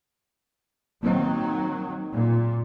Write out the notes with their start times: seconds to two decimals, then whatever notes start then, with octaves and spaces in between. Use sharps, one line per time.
1.03 D#3 F#3 A#3 C4 D#5
2.12 A#2